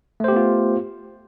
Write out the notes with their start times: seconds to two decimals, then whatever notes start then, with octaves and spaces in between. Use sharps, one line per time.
0.20 A3
0.24 C5
0.28 G4
0.32 B3
0.36 F4